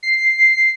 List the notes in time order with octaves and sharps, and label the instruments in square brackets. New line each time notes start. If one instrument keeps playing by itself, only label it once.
[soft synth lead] C7